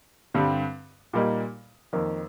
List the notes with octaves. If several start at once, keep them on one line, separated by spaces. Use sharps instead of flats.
G2 D3 G3 C4
A#2 G3 A#3 D#4
F2 D#3 A#3